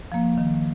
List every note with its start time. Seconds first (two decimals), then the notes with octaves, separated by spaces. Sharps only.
0.12 F3 A#3
0.38 D#3